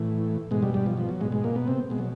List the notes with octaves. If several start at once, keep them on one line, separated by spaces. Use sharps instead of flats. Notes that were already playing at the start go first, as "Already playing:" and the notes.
Already playing: A2 E3
G#2 B2 G#3
G2 G3
G2 G3
F3
F3
F#3
G#2 B2 G#3
G#2 G#3
A#2 A#3
B2 B3
C3 C4
B2 G#3
F#3